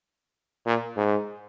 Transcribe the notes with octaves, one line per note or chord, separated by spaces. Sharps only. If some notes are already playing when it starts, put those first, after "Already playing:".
A#2
G#2